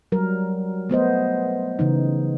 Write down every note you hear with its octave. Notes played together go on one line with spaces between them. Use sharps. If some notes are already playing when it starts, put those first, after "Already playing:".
F#3 G3 A#4
A3 B3 C5 D#5
C#3 E3 D#4